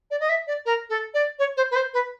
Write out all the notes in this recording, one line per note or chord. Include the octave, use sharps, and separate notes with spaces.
D5
D#5
E5
D5
A#4
A4
D5
C#5
C5
B4
C5
B4